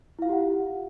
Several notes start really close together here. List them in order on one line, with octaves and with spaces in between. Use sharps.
E4 F5 F4 G4 F#5